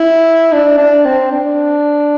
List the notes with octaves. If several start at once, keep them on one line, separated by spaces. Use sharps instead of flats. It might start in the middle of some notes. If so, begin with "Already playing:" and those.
Already playing: E4
D4
D4
C4
D4